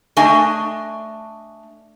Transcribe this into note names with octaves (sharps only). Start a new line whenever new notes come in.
A3 D4 D#5 G#5